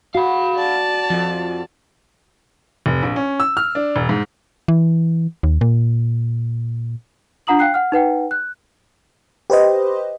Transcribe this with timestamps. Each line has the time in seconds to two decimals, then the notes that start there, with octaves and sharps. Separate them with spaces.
0.15 F#4 F5 B5
0.55 D5 A5
1.10 F2 F3
2.86 F1
3.03 A#1
3.16 C#4
3.40 E6
3.57 F6
3.75 D4
3.96 E1
4.09 G#2
4.68 E3
5.43 D#2
5.61 A#2
7.47 D4 F4 F#5 A#5 D#6 F#7
7.59 F5 G5 F#6 C7
7.74 F#5 F6
7.92 D#4 B4 F#5 G5
8.31 F#6
9.50 G4 B4 C5 D#5